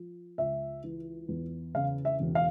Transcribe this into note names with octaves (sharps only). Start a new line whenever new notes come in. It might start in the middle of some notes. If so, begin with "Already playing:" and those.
Already playing: F3
C#2 E5
E3
E2
C#3 F5
E5
E1
F5